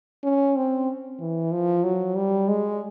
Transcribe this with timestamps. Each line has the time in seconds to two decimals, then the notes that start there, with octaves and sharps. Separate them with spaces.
0.24 C#4
0.56 C4
1.20 E3
1.52 F3
1.84 F#3
2.16 G3
2.48 G#3